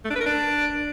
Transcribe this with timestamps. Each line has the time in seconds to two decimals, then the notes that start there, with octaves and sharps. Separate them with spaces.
0.05 A3
0.10 D4
0.15 B4
0.21 A#4
0.26 D4